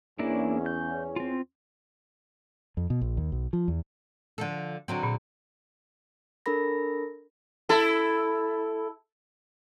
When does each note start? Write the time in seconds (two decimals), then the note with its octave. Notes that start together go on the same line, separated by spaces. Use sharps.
0.19 E2 A#3 C#4 D4 E4
0.66 G6
1.16 C4 F4
2.77 F2
2.90 B2
3.01 A#1
3.17 D#2
3.32 B1
3.53 F3
3.68 E2
4.38 D3 F3 A4
4.88 D3 F#3 C4
5.03 A#2
6.46 D4 A4 A#4 B5 A#6
7.69 E4 A4